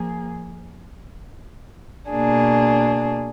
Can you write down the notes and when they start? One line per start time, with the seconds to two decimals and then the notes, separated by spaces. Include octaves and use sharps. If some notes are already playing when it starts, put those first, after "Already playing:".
Already playing: F3 A#3 G#4
2.11 B2 A#3 D4 G#4